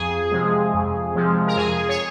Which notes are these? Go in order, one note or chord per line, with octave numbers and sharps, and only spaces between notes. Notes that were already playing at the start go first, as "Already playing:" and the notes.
Already playing: F2 G#4
C3 F3 G#3
F2
C3 F3 G#3
A#4
F2 G#4
C#5